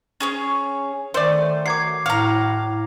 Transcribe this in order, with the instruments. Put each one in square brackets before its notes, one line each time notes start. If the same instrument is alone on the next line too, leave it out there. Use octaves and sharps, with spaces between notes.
[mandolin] C#4 G#4 C#5
[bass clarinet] D#3 [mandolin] A3 [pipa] C5 D5
[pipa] F#3 [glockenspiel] D6 G#6 C7
[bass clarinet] A2 [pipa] F#4 [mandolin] F5 A#5